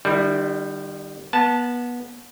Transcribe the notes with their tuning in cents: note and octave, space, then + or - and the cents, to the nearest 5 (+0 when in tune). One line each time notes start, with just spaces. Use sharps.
D#3 -45 G3 +0 E4 +0
B3 -25 A5 +0